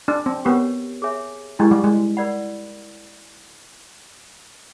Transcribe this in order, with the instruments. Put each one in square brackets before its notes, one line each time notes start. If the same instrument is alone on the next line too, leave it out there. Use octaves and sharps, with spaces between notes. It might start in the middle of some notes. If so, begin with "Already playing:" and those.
[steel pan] D4
C4
[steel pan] B3 [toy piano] G4 A#4 C#5
[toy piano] G#4 C#5 E5 G#5
[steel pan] G#3 [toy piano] E4 G4 A#4
[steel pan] G3
G#3
[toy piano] A#4 D5 F#5 B5